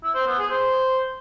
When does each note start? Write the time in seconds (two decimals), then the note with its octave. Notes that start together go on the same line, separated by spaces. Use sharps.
0.03 E4
0.15 C5
0.26 B3
0.38 G#4
0.50 C5